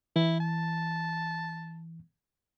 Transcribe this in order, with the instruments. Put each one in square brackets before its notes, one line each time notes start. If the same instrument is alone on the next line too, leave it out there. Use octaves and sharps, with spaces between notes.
[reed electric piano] E3 [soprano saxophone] E4
[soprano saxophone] A5